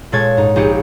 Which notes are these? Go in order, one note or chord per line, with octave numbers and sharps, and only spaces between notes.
A#2 G#3 A4 C#5 G#6 A6
G#2 D#4
A#1 D#4 G4 G#4 C#7